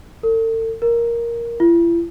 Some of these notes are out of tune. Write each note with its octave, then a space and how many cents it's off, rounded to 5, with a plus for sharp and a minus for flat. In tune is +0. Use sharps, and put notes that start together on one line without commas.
A4 +40
A#4 +5
E4 +45